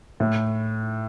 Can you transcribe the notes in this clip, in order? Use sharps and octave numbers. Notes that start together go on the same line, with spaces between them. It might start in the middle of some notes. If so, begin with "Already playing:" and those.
A2